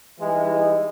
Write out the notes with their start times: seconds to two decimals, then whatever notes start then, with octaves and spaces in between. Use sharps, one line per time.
0.20 E3 G3 G#3 D#4 E4